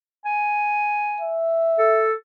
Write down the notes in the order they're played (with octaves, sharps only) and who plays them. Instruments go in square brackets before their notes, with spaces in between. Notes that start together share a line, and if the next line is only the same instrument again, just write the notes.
[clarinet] G#5
[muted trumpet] E5
[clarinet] A4